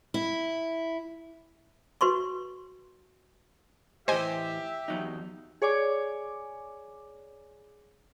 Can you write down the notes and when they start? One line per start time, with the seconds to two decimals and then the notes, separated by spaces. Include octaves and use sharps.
0.14 E4
2.01 F#4 B4 C6 C#6
4.08 A2 E3 G4 C5 D#5 E5 G#5
4.88 E2 F#3 D#4
5.62 G#4 C#5 D5 G#5 D6